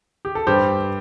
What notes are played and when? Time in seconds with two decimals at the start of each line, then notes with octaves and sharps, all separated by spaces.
0.25 G4
0.35 A4
0.47 G2 G3 G4 C5